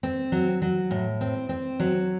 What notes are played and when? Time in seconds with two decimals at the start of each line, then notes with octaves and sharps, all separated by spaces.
0.03 C4
0.32 F#3
0.62 F#3
0.91 A2
1.21 C4
1.49 C4
1.80 F#3